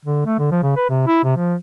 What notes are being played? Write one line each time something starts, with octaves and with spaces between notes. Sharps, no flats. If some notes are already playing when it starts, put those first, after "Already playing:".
D3
A3
D3
F3
C#3
B4
C3
E4
C3
F3